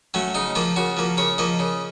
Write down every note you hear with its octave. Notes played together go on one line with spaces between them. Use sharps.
F#3 A3 C#4
C#3 D#4
F3 A#3 F4
C#3 F#4
F3 A#3
C#3 C#5
F3 A#3 D#5
C#3